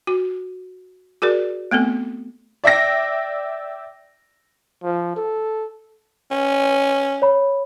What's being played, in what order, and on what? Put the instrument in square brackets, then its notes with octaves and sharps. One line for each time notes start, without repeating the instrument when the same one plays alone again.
[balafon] F#4
F#4 G#4 A#4 D5
A3 B3 C4 A4
[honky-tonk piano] D5 E5 G5 A#6
[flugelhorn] F3
A4
[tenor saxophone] C#4
[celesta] C#5 B5